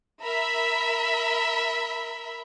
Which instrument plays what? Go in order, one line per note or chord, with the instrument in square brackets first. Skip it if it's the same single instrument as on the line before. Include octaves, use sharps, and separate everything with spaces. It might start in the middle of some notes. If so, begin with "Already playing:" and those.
[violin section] A#4 E5 B5